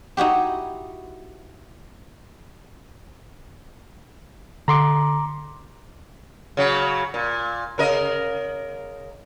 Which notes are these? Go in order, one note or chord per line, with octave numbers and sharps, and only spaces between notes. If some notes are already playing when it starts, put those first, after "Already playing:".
D#4 E4 F#4 G4
D3 A#5 C6 D6
C#3 F#3
A#2
C#3 A#4 D#5